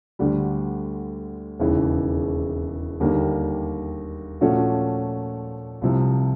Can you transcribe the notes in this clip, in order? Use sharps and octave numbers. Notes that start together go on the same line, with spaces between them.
D2 D3 G3
E1 D#2 C#3 E3
D#2 D3 G3 A#3
A#2 F3 A3 C#4 F#4
C2 C3 F3